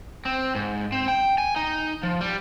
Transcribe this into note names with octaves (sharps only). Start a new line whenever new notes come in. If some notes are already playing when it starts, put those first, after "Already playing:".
C4
G#2
C4
G5
G#5
D#4
F3
G3